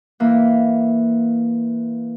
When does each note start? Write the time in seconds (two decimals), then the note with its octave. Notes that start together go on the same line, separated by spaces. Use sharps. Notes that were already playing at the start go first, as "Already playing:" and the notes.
0.20 E3 A#3